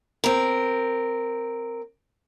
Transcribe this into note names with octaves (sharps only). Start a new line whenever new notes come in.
C4 A#4